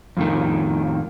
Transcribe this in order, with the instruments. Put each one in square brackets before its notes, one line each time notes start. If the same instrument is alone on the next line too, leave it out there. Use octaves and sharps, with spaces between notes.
[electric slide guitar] F2 A2 D#3